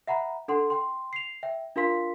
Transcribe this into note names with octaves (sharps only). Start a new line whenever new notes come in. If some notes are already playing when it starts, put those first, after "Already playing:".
E5 F#5 A#5 B5
D4 A4 F#5 C6
G5 C6
C7 F7
E5 G5
D4 F4 A#4 F5 C6 B6